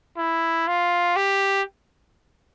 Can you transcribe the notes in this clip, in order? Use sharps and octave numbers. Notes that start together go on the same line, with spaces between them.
E4
F4
G4